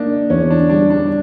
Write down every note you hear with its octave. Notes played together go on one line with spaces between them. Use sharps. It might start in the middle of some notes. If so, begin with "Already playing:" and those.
Already playing: A#3 D4 D#4
E2 C#4
D4
G3 D4
D4